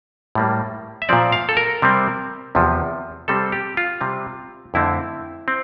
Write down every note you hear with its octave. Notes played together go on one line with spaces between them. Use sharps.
A2 G3 A#3
E5
A#2 F3 C4 D5
F5
A4
A#4
C3 G3 C4
E2 C3 F3
C3 G3 C4 A4
G4
F4
C3 G3 C4
F2 D3 A3 C4 E4
C4